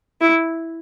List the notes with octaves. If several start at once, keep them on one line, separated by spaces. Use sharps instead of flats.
E4